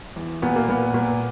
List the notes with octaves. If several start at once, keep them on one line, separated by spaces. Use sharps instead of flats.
E2
A#2 B3
A#3
A#2 B3
A#2